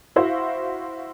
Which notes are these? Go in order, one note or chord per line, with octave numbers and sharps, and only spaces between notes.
E4 F#4 C5 E5 F5